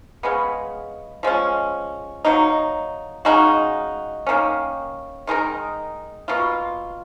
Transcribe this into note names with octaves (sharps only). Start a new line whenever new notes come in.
C#3 G#3 B3
F3 G#3 C#4
F#3 A#3 D#4
C#3 G#3 D#4 F#4
D#3 A#3 C#4
D#3 G#3 D#4 A#4
B2 A#3 F4